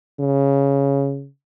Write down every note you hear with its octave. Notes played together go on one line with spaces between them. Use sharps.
C#3